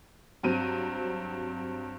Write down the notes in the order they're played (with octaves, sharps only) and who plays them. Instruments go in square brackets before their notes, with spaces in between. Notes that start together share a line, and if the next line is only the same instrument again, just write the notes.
[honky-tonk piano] G2 F#3 C4 D#7